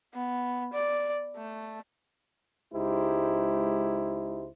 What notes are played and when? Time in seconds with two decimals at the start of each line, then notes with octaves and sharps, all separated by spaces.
0.14 B3
0.73 D5
1.36 A3
2.73 C#2 G#3 D#4 E4 G4 C5